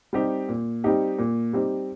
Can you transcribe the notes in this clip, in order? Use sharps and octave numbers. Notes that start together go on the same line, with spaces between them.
G3 C4 D#4 G4
A#2
G3 C4 D#4 G4
A#2
G3 C4 D#4 G4